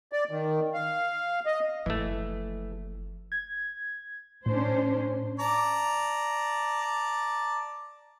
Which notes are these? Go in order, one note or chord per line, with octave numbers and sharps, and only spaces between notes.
D5
D#3
F5
D#5
F#1 E3 F3 A3
G#6
A2 C#4 D4 C5
D5 A5 A#5